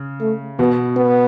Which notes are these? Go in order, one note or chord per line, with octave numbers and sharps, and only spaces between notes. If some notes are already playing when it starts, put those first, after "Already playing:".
Already playing: C#3
A3
B2 B3
B3